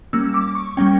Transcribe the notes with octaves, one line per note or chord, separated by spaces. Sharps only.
G3 A#3 C#4 E6
D6
C#6
G3 A#3 C#4 G5